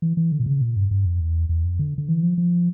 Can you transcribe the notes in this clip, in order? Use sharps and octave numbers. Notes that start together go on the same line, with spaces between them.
E3
E3
D3
A#2
C#3
A#2
G2
G2
F2
E2
E2
F2
D3
D3
E3
F3
F3